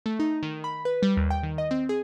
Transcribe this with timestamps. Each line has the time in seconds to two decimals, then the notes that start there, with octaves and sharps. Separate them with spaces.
0.06 A3
0.19 D#4
0.43 D#3
0.64 B5
0.85 B4
1.02 G3
1.17 D#2
1.30 G5
1.43 D#3
1.58 D#5
1.71 C4
1.89 G#4